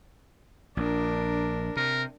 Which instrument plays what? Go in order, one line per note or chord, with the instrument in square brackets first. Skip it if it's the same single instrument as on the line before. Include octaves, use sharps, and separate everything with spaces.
[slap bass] A#1 [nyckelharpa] D4 A#4
[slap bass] C3 [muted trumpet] A#4